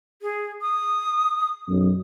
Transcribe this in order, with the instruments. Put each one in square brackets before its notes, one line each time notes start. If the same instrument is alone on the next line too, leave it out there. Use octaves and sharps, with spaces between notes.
[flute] G#4
D#6
[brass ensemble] B1 F#2